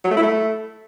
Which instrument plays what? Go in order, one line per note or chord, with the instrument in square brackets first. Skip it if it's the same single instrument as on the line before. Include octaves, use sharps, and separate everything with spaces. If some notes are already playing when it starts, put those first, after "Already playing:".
[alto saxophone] F#3
A3
E4
A3